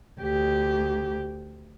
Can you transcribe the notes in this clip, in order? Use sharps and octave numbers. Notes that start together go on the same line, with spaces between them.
D2 G4